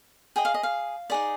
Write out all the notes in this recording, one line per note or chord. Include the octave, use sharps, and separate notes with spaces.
G#4 D#5 G5
F5
D#5
F5
D#4 G#4 D5